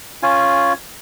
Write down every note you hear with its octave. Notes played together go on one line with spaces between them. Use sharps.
C#4 F4 G#5